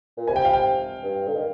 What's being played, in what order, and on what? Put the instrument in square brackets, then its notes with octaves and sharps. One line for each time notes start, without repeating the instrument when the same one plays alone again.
[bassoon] A#2
[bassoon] C3 [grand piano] G#5
[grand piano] G5
F5
G5
[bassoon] G2
D3
D#3